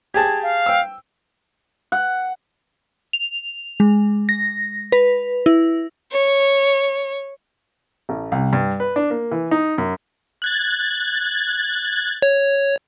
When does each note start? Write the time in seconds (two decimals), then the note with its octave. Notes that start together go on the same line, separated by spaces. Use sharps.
0.14 G4 G#4 A5 G#6
0.43 F5
0.66 G5 E6
1.92 F#5
3.13 F7
3.80 G#3
4.29 A#6
4.92 B4
5.46 E4
6.12 C#5
8.09 A1
8.32 C2
8.53 G2
8.80 B4
8.96 D4
9.10 A#3
9.32 E3
9.51 D#4
9.78 F#2
10.42 F#6 G#6 A6
12.22 C#5